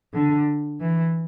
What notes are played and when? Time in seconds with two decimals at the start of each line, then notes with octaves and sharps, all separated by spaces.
0.13 D3
0.80 E3